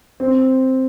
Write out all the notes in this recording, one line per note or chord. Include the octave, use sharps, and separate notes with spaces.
C4